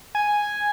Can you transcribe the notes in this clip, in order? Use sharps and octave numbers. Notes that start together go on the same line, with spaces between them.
G#5